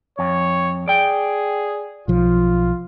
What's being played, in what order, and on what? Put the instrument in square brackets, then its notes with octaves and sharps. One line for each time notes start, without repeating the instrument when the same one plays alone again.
[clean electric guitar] F2 [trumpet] C#5
[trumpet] G#4 [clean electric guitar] D5 G5
[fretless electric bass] B1 F3 [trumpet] F4